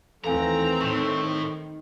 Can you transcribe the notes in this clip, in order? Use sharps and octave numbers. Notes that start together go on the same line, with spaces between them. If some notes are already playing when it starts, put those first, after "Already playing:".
D#2 E3 A3 C4 A4 F5 G#5 A#5
A2 D#3 C#6